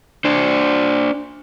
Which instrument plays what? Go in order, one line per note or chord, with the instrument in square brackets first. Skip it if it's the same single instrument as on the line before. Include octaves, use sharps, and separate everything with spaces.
[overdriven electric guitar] D4 C5